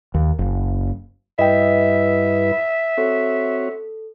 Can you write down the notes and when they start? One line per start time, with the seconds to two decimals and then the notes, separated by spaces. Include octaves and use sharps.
0.14 D#2
0.39 F#1
1.39 G2 E4 B4 D#5 E5 G5
2.98 C4 F#4 A4 C#5